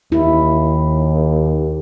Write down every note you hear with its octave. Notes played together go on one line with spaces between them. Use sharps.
D#2 E4